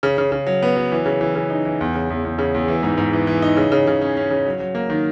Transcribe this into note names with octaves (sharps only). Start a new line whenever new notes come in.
C#3
C#3
C#3
F#3
B3
F#3
E3
C#3
E3
C#3
D#4
E3
E2
C#3
E2
E2
C#3
E2
E3
G#2
G#2
E3
E3
D#4
C#3
C#3
C#3
C#4
C#4
C#3
F#3
F#3
A#3
D#3